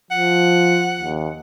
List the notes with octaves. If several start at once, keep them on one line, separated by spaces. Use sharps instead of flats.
F3 F#5
D#2